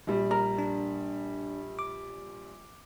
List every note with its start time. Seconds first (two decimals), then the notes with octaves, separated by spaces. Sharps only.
0.07 A#1 G3
0.31 A#4
0.58 D4
1.79 D6